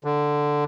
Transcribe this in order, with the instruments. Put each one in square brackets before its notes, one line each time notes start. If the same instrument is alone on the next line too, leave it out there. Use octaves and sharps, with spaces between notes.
[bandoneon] D3